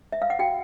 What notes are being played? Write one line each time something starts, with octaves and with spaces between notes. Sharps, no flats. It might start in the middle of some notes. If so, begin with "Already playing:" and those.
E5
F5
F#5
F#4 G5